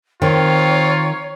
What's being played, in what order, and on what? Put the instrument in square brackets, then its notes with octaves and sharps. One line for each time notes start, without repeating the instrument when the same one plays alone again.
[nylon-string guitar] D#3 [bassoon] C4 [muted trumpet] F4 [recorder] C#5